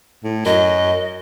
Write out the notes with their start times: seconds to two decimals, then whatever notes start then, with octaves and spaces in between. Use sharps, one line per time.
0.24 A2
0.46 F#2 D#5